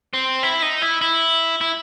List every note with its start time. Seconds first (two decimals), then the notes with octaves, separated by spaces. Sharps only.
0.14 C4
0.43 E4
0.62 D#4
0.82 E4
1.02 E4
1.61 E4